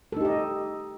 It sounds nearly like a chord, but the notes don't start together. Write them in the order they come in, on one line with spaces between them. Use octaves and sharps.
A4 D#4 G4 D#5